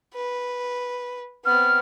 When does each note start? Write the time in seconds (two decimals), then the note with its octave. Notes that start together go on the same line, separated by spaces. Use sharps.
0.14 B4
1.45 B3 C4 F6